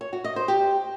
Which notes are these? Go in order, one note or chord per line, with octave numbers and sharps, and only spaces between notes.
C#5
F#4
D#5
C5
G4